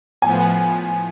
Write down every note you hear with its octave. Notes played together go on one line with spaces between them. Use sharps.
A2 F3 B3 G#5